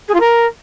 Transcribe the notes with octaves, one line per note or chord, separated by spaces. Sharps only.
G#4
F4
A#4